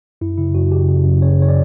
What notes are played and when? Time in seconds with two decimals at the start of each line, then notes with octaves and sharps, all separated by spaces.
0.21 F#2 E4
0.37 C#3 E4
0.54 F#2 F#4
0.71 C#3 G4
0.88 C#3
1.06 F#2
1.22 C#3 C#5
1.39 C#3 C#5
1.49 D5